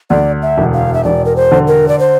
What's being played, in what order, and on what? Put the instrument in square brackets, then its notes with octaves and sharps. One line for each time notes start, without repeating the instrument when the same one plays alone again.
[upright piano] D2 [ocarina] D5
[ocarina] E5
[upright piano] E1
[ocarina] F5
E5
[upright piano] E1 [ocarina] D5
[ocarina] A#4
C5
[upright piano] D3
[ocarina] A#4
D5
C5